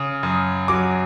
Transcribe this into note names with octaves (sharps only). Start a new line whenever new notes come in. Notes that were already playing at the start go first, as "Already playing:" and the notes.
Already playing: C#3 D#6
F#2
F#3 D6